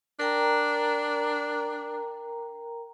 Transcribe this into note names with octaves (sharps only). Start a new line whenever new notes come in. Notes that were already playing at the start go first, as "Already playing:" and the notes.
D4 A#4 G5 A#5